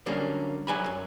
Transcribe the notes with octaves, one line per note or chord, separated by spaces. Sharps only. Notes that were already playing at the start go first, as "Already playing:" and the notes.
D3 F#3 G3 A#3 C#4
C2 F#3 G#5 B5
F#2